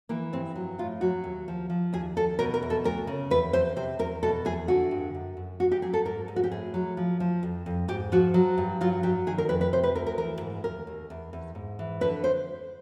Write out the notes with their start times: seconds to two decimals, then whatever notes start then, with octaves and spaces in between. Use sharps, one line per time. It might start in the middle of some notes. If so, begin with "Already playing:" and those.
0.09 E3 A#3
0.33 G2 C4
0.56 F#3
0.78 A2 F4
1.01 F#3 F#4
1.24 D#2
1.48 F3
1.70 F3
1.93 D#2 G#4
2.16 D#2 A4
2.39 B2 A#4
2.54 A#4
2.62 E2
2.70 A4
2.84 D2 A#4
3.07 C#3
3.31 E2 B4
3.53 E2 C5
3.76 C3 C5
3.99 E2 A#4
4.23 B2 A4
4.45 E2 G#4
4.68 D3 F#4
4.91 G2
5.15 F#2
5.37 F#2
5.60 G2 F#4
5.72 G4
5.82 F#3 G#4
5.94 A4
6.05 G#2 A#4
6.28 G#2
6.36 F#4
6.44 G4
6.52 A2 G#4
6.74 F#3
6.97 F3
7.20 F3
7.43 F2
7.66 F2
7.88 G#2 G4
8.12 F3 F#4
8.34 F#3
8.58 G2
8.81 F#3 F4
9.03 F#3 G4
9.27 D#3 G#4
9.38 A#4
9.49 F2 B4
9.61 B4
9.73 C3 C5
9.83 B4
9.95 D2 A#4
10.07 A#4
10.18 E3 A#4
10.41 G#2
10.64 D#2 A#4
10.87 D#2
11.10 E2
11.33 E2
11.55 G#2
11.79 E3
12.01 D3 B4
12.24 C5